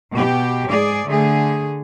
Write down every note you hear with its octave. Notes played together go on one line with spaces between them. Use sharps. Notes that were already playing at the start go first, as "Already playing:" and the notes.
B2 G4
G#2 G#4 D5
D3 A3 G#4